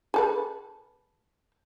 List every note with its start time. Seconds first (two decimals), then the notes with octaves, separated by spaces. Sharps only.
0.14 G#4 A4 B4